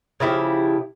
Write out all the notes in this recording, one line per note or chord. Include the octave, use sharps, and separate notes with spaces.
C#3 F3 E4 G4